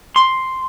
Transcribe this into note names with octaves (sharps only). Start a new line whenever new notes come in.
C6